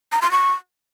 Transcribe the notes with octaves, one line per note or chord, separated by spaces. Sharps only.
A#5
C6
C#6